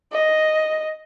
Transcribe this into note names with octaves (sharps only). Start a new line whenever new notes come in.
D#5